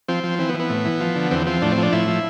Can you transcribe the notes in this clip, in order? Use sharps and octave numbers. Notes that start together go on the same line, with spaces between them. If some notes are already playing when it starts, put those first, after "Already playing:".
F3 C4
F3
E3 C4
B3
E3
B3
A2
E3
F3
D3
E2 C4
F3 C4
A2 D4
C4
F3
D4
A2 E4
F3